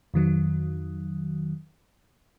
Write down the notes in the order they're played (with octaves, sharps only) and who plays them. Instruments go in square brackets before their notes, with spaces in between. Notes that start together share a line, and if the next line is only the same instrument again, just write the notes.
[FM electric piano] F2 D#3 F#3